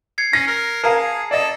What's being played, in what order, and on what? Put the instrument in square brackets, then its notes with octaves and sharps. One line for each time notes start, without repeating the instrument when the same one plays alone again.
[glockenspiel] G#6 C7 C#7
[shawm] C#4 [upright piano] A#6
[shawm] A#4
[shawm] G#4 [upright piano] A#4 F5 [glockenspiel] A5 A#5
[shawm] A4 [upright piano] D5 D#5